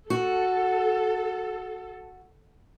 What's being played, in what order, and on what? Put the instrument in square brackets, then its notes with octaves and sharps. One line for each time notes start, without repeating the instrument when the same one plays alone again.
[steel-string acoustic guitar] F#4 [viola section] A4